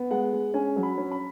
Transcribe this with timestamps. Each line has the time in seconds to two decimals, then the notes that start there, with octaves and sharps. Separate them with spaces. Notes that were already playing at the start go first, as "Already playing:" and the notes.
Already playing: B3
0.11 G#3 F#5
0.33 G#3
0.54 C#4 G#5
0.76 F#3
0.83 B5
0.98 C#4
1.12 B5